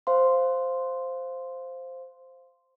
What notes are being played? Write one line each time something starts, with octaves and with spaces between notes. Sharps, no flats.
C5 F5 C6